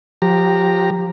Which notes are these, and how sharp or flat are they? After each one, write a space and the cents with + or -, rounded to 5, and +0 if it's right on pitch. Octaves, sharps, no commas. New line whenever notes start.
F3 +30 G4 +0 A#5 -5